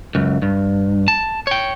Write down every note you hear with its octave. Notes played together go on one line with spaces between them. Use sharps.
C#2 F#2
G2
A5
C#5 G5